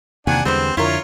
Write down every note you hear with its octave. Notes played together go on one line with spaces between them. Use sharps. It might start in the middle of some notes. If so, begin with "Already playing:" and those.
E2 C3 D#3 A#3 D4 F#5 G#5
E2 D3 G3 G#3 B3 C4 C5
F2 D3 E4 F4 A#4 C#5